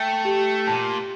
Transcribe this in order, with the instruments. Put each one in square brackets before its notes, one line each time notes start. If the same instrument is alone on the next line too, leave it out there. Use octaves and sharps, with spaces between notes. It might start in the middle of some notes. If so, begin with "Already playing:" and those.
Already playing: [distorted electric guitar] A3 [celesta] G5
[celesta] G4
[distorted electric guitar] A#2 [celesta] A5